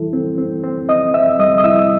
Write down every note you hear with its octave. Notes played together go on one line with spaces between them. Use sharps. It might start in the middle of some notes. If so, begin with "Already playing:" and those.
Already playing: E3 G3 E4 A4
C4
C4
C4
C4 D#5 D#6
C4 E5 E6
G3 D#5 D#6
D#6
E4 E5 E6